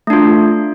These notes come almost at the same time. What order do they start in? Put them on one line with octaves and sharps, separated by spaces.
A3 D4 F4